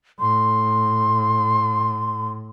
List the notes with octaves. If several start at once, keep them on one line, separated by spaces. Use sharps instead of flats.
A2 C6